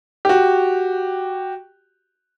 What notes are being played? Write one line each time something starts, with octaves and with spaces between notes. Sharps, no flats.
F#4 G4